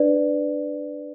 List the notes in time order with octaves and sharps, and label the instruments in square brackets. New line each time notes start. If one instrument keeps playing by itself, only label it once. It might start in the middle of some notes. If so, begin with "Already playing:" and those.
Already playing: [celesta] D4 B4 D5